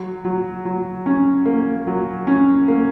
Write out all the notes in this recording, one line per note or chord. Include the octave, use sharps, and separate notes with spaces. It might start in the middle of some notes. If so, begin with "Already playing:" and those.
Already playing: F#3
F#3
F#3
C#4
A#3
F#3
C#4
A#3